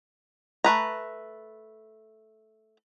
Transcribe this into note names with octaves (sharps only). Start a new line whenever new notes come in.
A3 B4 A#5